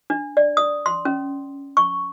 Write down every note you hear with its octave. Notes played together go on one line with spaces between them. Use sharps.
D4
D5
D#6
C6
C#4
C#6